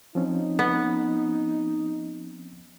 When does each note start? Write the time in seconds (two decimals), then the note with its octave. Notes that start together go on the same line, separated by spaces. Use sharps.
0.15 F3 C4 C#4 D#4
0.59 B3